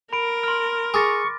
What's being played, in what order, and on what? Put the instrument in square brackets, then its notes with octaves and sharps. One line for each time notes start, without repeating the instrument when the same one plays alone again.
[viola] A#4 [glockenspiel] B5 D7
[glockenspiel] C6 F6
[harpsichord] G#4 [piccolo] C#6 [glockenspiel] D6 A6 A#6